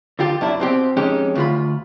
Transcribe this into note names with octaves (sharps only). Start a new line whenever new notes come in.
D3 F4 G4
F#2 D4 E4
B2 C4 G4
F2 G#3 C#4 D#4 G4
D2 F4 B5